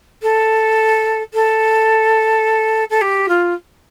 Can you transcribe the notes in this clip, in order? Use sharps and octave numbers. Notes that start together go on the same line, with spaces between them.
A4
A4
A4
G4
F4